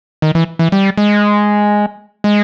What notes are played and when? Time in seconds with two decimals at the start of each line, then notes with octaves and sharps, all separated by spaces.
0.22 D#3
0.35 E3
0.59 E3
0.72 G3
0.98 G#3
2.24 G#3